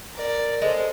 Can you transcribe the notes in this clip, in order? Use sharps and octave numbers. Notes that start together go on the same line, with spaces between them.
A#4 D5
G#3 A4 C5